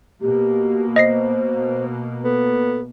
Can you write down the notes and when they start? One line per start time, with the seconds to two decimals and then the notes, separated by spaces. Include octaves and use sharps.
0.21 B2 A#3 G4
0.96 C5 D#5 A#6 C7
2.24 B3 A4